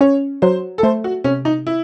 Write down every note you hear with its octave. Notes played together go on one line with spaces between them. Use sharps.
C#4 C#5
F#3 C5
A4
A3 C5
F#4
C3 C#4
D#4
E4